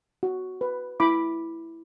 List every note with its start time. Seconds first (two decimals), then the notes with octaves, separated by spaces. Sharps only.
0.23 F#4
0.61 B4
1.00 E4 B5 D6